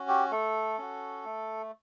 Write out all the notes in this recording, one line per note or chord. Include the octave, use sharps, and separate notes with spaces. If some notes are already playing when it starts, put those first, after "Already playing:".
Already playing: C#4 F#4
G4
A3 A4
C#4 F#4
A3